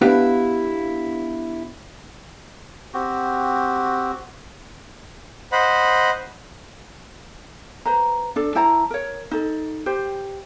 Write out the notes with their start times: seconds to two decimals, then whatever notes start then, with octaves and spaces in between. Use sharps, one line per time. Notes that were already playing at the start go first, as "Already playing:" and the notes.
0.01 B3 D4 E4 G4 B4 F5
2.94 C4 F#4 G4
5.52 C5 D#5 F#5 B5
7.86 B4 C5 A#5
8.36 D4 A4
8.55 E4 C5 A5 A#5
8.90 A#4 C#5
9.31 D#4 A4
9.86 G4 C5